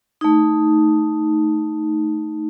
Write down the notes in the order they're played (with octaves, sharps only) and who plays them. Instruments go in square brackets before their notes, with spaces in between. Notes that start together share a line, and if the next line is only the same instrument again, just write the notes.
[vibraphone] A3 D#4